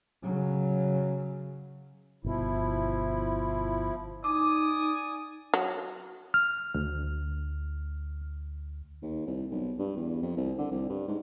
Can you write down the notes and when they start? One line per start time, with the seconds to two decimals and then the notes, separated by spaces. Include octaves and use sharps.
0.23 C#3 F#3
2.24 G1 B2 F3 E4
4.24 D#4 D5 G#5 D6 D#6
5.54 F#3
6.34 F6
6.75 D2
9.02 D#2
9.27 C2
9.52 B1
9.79 G2
9.97 E2
10.22 F2
10.37 C2
10.58 D3
10.71 C2
10.89 G2
11.08 G#2